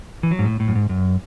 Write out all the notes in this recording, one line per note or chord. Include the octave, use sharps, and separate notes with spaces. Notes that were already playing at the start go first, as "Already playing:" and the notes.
E3
F#3
G#2
A2
A2
F#2
G#2
F#2